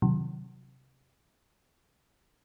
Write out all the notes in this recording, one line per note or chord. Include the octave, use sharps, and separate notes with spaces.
C3 D#3 F#3